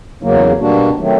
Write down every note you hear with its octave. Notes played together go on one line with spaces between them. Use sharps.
E2 C#3 F#3 A#3
B2 G3 A#3 D4 F#4
D#3 F#3 A3 C4